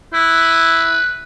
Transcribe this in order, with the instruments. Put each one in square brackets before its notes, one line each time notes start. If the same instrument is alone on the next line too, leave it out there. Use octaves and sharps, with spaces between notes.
[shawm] E4 [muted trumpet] B4